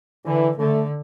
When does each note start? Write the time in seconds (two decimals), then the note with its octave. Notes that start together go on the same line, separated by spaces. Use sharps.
0.25 D3 E3
0.58 D3 A3